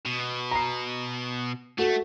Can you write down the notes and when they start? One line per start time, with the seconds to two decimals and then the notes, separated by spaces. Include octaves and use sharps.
0.06 B2
0.51 A#5 C7
1.78 A3 F#4 A4